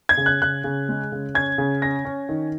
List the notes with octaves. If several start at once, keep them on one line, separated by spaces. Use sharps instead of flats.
G#6
C#3
F#6
C#3 F#6
C#3
G#3
C#3
C#4 G#6
C#3
C#4 A#6
C#4
D#3